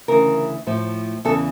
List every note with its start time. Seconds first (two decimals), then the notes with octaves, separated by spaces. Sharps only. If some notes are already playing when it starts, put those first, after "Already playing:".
0.08 D2 C#3 E3 A#4
0.67 A2 F3
1.25 E2 C#3 E3 A4